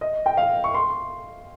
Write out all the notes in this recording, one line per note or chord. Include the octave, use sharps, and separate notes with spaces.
D#5
G5
F5
C#6
C6